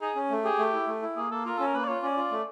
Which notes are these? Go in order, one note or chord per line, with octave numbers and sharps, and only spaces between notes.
D#4 G#4
C#4
A3
G4 G#4
A3
E4
A3
E4
A#3 G#4
A#3 A4
F4 A#4
C#4 A4
A#4
A#3 B4
D5
F4 C#5
C#4 D5
F4
A3